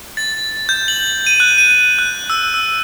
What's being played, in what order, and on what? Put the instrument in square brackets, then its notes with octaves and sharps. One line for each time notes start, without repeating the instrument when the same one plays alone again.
[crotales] A6
G6
F#7
D#7
F#6
D#7
F#6
E6
E6